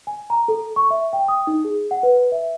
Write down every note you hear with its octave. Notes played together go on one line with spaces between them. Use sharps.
G#5
A#5
A4
C#6
E5
G5
D#6
D#4
G#4
F#5
B4
E5